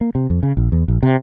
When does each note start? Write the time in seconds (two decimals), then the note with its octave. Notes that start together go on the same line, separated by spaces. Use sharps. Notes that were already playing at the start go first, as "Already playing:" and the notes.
0.01 A#3
0.15 C3
0.30 F2
0.43 C#3
0.57 A#1
0.72 E2
0.88 A#1
1.03 C3